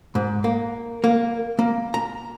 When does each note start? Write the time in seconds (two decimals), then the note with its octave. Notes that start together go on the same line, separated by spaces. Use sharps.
0.15 G#2
0.44 A#3
1.04 A#3
1.59 A#3
1.94 A#5